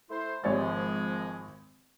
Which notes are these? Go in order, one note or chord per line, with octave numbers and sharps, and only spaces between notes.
A3 E4 C5
G#1 F3 G#3 C#5 A6